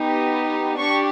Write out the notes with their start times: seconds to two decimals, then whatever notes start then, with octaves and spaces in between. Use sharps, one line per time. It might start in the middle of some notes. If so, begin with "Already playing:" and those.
Already playing: B3 D#4 G4
0.77 D4 G4 C#6